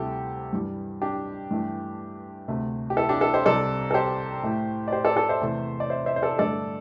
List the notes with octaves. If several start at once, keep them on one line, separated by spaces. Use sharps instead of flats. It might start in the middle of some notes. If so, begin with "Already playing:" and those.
Already playing: D2 C3 G3 E4 G4 A4
G2 E3 G3
D4 G4
G2 E3 A3
D2 C3 A3
G4
E4 A4
D4 G4
E4 A4
G4 C5
C2 C3 G3 A4 D5
A4
G4 C5
A2 A3
D5
G4 C5
A4 D5
A4 D5
C5 E5
E2 C3 A3
D5
C5 E5
C5 E5
C5
A4 D5
G2 D3 A3 A4 D5